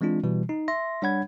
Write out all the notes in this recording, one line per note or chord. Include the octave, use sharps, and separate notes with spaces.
E3 G#3 C4 D4 F4
B2 E3 G3
D#4
E5 C6 A#6
G3 D4 C#5 F#5 B5 G#6